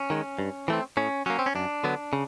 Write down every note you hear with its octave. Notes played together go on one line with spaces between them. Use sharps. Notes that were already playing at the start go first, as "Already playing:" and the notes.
Already playing: C#4
D#3 G#3
G2
E3 A3 C4
A2 C#4
F#3 A#3 C#4
C4
C#4
F#2 D4
D3 F#3 B3
C#3